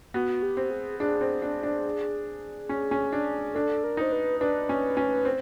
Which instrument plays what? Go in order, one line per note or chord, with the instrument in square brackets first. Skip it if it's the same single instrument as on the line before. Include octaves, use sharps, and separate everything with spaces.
[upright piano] B3 [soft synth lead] F#4
[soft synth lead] G4
[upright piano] C4
[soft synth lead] G#4
[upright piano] D4 [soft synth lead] G#4
[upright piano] C4
D4
D4
C#4
C#4
D4
[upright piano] D4 [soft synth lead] A4
[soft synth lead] A#4
[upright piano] D#4 [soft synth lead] C5
[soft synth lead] B4
[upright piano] D4 [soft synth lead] B4
[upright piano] C#4
C#4
C4